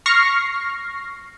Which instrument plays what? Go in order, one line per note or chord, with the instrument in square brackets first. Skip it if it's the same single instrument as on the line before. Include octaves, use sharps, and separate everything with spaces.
[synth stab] C#6 F6 A#6 C7